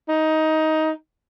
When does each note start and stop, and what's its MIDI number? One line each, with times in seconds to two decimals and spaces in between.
0.09 0.90 63